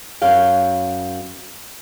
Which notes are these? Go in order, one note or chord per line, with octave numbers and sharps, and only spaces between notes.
F#2 C#5 F5 G5